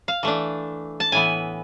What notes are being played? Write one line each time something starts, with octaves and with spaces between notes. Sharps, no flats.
F5
E3 A3 D4
A5
A2 E3 B3 G#5